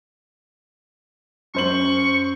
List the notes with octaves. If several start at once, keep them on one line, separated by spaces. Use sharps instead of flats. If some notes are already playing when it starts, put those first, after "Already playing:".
F#2 C5 C#6 F#7